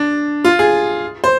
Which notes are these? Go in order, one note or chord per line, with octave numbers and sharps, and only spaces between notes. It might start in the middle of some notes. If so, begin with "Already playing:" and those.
Already playing: D4
F4
G#4
C5